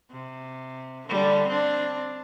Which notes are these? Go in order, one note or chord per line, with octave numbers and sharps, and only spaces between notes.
C3
D3 G3
C4 D4